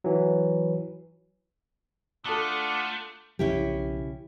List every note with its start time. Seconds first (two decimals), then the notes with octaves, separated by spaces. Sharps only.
0.04 E3 F#3
2.25 A3 D4 F4 A4 F#5 A5 A#5 D#6
3.39 B1 C#3 F3 C#4 E4 G4